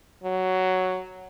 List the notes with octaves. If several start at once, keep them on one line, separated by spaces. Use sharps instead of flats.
F#3